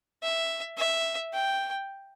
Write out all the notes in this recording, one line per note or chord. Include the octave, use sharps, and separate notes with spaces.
E5
E5
G5